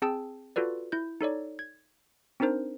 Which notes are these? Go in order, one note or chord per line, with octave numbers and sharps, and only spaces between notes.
C4 G#4 G5 A5 E6
F4 F#4 A4 B4 D5
E4 G6
D#4 A4 C#5 D5
G#6
C4 D4 D#4 A#4 C5